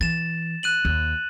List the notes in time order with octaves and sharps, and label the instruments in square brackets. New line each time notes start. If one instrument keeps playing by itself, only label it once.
[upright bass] E3 [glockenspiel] A6 E7
[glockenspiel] F#6 D#7 F#7
[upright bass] D#2